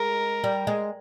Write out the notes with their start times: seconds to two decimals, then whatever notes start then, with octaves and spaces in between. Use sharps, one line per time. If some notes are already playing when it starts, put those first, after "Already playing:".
Already playing: G#3 A#4
0.44 G3
0.67 G#3